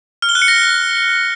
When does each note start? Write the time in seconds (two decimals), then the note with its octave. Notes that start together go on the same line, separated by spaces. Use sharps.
0.22 F6
0.29 G7
0.35 F#6
0.42 C#7
0.48 A#6